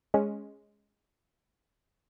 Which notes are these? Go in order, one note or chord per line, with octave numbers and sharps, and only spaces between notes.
G#3 C#4